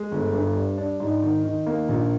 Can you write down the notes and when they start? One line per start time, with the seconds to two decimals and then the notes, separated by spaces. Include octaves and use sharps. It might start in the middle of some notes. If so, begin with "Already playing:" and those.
Already playing: G#3
0.11 G1
0.34 G2
0.55 G3
0.78 D4
1.00 G#2
1.22 D#3
1.44 D#3
1.66 A#3
1.89 A#1